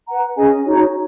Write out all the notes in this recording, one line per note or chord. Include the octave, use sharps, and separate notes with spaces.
B4 F#5 A#5
C#4 G#4 D#5 G#5
D#4 F#4 C#5